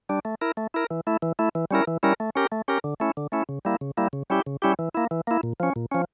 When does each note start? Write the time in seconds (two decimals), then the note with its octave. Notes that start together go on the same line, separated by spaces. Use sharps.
0.09 G3 D4
0.25 A3
0.41 E4 A#4
0.57 A3
0.74 E4 A#4
0.91 E3
1.07 A3 E4
1.22 E3
1.39 A3 E4
1.55 E3
1.71 G3 C#4 E4 A#4
1.87 E3
2.03 G3 C#4 E4 A#4
2.20 A3
2.35 C#4 G4 A#4
2.52 A3
2.68 C#4 G4 A#4
2.84 D3
3.00 A3 C#4 E4
3.17 D3
3.32 A3 C#4 E4
3.49 C#3
3.65 G3 A#3 E4
3.81 C#3
3.97 G3 A#3 E4
4.13 C#3
4.30 G3 C#4 E4 G4
4.47 C#3
4.62 G3 C#4 E4 G4
4.79 E3
4.95 A#3 E4
5.11 E3
5.27 A#3 E4
5.43 A#2
5.60 F3 C#4
5.76 A#2
5.91 F3 C#4